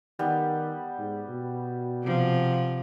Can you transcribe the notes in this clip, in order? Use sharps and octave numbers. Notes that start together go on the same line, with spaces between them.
D#3 G3 B3
G#2
B2
C3 F3